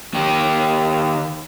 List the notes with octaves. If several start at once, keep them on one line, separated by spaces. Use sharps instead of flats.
D#3 G4